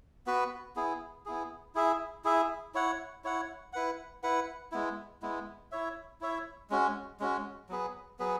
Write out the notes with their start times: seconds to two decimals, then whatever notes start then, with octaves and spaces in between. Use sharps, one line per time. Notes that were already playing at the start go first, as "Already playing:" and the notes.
0.26 B3 F#4 B4
0.76 B3 E4 G#4
1.26 B3 E4 G#4
1.75 E4 G#4 E5
2.24 E4 G#4 E5
2.74 E4 C#5 F#5
3.24 E4 C#5 F#5
3.73 E4 B4 F#5
4.23 E4 B4 F#5
4.72 G#3 B3 E4
5.22 G#3 B3 E4
5.72 E4 C#5 E5
6.21 E4 C#5 E5
6.70 G#3 C#4 F#4
7.20 G#3 C#4 F#4
7.69 F#3 B3 G#4 B4
8.19 F#3 B3 G#4 B4